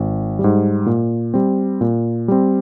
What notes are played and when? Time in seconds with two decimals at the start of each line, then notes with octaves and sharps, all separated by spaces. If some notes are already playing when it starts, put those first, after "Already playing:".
Already playing: G#1
0.39 G3
0.44 G#2
0.86 A#2
1.34 G3 C4
1.81 A#2
2.28 G3 C4